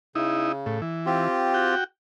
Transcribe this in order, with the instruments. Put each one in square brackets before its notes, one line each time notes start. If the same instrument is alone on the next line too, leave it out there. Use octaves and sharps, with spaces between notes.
[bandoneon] C#3 [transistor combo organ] D#4 E4
[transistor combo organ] A2
E3
[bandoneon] C4 F4 G4
[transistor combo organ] F#4 G5